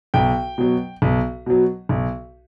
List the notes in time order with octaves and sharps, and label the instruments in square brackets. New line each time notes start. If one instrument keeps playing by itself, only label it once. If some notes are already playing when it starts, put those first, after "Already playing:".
[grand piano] B1 G5
B2 F#3
B1
B2 F#3
B1